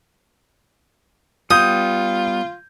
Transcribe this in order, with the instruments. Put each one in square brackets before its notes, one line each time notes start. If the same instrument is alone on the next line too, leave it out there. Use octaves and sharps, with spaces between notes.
[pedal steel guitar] G3 B3 [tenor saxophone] F4 [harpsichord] D#6 [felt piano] G6